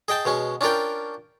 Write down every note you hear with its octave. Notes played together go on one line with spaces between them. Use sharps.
G#4 D#5 G5 A5
B2 G#3 C#4
C#4 D4 F4 A#4 G5